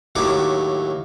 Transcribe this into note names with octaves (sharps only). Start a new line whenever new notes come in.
D#2 A2 F#3 D6